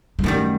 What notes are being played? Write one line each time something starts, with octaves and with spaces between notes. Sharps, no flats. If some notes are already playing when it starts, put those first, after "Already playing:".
G#3
F#2 D#3 G3 A3